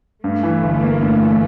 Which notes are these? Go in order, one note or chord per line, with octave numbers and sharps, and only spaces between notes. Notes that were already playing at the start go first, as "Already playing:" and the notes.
G2 A3
E3
G1
A#3
G2
E3